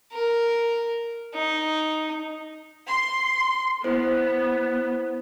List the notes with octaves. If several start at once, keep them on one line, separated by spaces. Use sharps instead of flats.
A#4
D#4
C6
B3 E4 C5